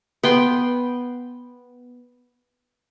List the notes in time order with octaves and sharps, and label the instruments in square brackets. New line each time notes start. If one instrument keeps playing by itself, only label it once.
[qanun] B3 G5 C6